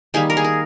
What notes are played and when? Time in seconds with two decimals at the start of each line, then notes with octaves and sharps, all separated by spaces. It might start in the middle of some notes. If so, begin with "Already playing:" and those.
0.14 D#3 G3 A#3 G#4
0.30 A#4
0.37 G#4
0.44 A#4